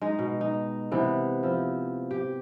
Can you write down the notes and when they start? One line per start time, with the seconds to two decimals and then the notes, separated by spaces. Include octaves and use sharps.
0.02 G#3 D#4
0.19 B2
0.41 D#4
0.92 C3 E3 B3
1.43 F3 E4
2.11 G4